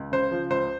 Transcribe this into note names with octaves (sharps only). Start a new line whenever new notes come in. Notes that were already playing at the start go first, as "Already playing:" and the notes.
Already playing: C#2
C#3 C5
F3
C#2 C5